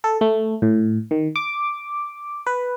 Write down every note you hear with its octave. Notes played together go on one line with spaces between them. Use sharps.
A4
A3
A2
D#3
D6
B4